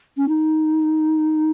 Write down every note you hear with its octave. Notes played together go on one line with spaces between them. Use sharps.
C#4
D#4